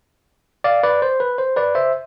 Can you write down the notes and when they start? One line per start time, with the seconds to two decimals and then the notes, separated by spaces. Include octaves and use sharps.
0.64 D5 F5
0.83 B4 D5
1.02 C5
1.20 B4
1.38 C5
1.56 B4 D5
1.75 C5 E5